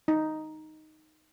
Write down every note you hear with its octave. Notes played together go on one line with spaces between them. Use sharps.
D#4